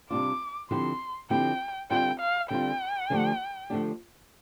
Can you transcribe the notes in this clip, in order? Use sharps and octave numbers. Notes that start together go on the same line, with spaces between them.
C3 G3 D4 F4 D6
D3 F3 C4 E4 G4 C6
D3 F3 C4 E4 G4 G5
D3 G3 C4 F4 G5
F5
D3 G3 C4 F4 G5
D3 F3 A3 D4 G4
D3 F3 A3 D4 G4